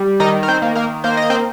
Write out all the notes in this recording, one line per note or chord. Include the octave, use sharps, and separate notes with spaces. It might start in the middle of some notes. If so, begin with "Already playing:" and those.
Already playing: G3
D#3 D#4 D#5
A#4
C4 C5
A#3
A#3 A#4
A#3 C5
D#5
C4 C5